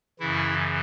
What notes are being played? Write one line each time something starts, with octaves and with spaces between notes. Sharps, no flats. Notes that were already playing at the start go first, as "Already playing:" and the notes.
F#2 C#3 E3 E4